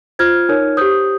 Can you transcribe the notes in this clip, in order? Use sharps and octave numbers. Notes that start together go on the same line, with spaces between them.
F4 C5 F6 G#6
D#4 A#4 C#5
G4 C5 D#6 G6